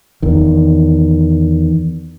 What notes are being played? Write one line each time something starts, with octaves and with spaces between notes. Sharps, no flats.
E2 D#3